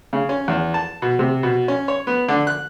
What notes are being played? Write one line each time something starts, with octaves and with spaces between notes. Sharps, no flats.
C#3
C#4
E2
A5
B2
C3
B2
C#4
C#5
B3
D3
F#6